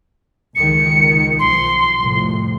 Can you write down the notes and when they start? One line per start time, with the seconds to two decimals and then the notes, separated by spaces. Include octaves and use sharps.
0.55 C#2 D#3 C#7
1.39 B1 F3 C6
1.99 C2 F2 A2